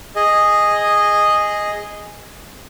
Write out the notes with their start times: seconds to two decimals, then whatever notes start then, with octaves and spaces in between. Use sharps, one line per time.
0.16 G#4 D#5